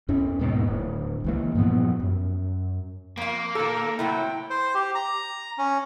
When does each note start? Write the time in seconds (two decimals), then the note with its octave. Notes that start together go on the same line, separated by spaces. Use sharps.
0.09 E2 C#4
0.39 D#2 G#2 B2 D#3
0.67 D1
1.24 C#2 E3 A#3
1.55 G2 A#2 F3 B3
2.00 F#2
3.17 F2 A#3 F5
3.55 A#2 D#3 A4 A#4
3.99 A2 C3 F#3 E4 G5
4.50 C5
4.75 G4
4.95 A#5
5.58 C#4